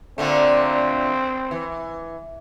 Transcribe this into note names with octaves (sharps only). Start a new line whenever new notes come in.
A#2 D3 A3 C4
E3